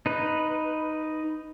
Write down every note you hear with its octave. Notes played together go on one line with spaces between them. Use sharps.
D#4 B4